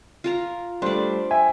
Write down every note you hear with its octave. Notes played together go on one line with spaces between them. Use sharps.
F4 A#4 A#5
G3 A3 D4 C5 D5
E5 G5 G#5